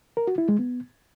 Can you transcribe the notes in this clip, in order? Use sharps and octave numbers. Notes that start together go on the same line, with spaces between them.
A#4
F#4
E4
G#3
B3